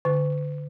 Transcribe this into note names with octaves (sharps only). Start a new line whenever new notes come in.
D3